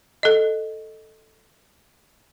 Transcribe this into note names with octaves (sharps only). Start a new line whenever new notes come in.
A4 D#5